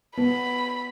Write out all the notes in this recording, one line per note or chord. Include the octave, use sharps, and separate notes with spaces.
B3 B5